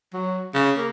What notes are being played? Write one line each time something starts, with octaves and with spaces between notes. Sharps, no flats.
F#3
C#3
A#3